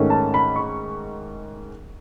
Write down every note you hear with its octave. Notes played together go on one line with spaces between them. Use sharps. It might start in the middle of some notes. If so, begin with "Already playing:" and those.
Already playing: G#2 D#3 A3 C#4
A5
B5
C#6